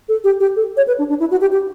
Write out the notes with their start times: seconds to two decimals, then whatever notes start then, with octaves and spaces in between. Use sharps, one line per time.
0.09 A4
0.24 G4
0.40 G4
0.56 A4
0.77 C#5
0.87 B4
0.99 D4
1.09 D4
1.20 E4
1.31 F#4
1.41 G4
1.52 G4